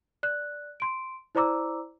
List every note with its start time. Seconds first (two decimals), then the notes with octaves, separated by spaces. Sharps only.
0.23 D5 F#6
0.80 C6 D7
1.35 E4 C5 D5 A#5 D6 E6